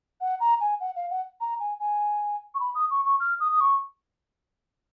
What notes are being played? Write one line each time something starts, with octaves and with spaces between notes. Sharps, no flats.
F#5
A#5
G#5
F#5
F5
F#5
A#5
G#5
G#5
C#6
B5
D#6
C#6
C#6
F6
D#6
D#6
C#6